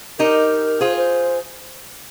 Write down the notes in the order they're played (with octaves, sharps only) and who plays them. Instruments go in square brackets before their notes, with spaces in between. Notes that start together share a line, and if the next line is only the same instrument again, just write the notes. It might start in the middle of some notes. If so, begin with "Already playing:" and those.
[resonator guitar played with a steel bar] D#4 G4 [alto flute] A#4
[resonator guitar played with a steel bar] F4 G#4 [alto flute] C5
[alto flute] C5